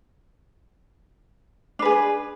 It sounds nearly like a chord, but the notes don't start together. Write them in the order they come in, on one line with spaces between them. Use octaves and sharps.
D4 B4 G#4